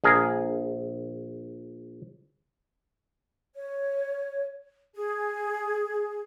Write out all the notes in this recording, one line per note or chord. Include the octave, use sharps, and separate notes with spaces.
A#1 G#4 A#4
C#5
G#4